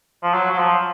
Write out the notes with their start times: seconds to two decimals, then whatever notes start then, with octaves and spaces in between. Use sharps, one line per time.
0.22 F3
0.34 F#3
0.50 F#3
0.58 F3